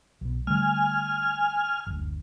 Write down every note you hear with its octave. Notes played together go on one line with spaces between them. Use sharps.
B1 B2
D3 G3 A3 G#5 F6
F#1 D2